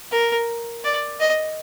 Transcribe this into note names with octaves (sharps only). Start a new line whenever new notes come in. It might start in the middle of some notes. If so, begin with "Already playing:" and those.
A#4
D5
D#5